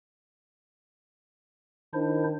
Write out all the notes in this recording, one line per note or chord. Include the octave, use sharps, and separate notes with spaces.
D#3 D4 E4 C5